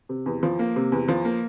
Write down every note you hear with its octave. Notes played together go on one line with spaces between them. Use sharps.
C3
E2
F3
A#3
C3
E2
F3
A#3